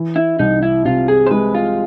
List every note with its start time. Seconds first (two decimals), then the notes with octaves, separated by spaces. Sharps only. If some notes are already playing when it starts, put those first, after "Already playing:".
Already playing: E3
0.16 E4
0.39 C2 D#4
0.63 E4
0.85 C3 F4
1.08 G#4
1.26 C5
1.31 G#3 B4
1.55 F4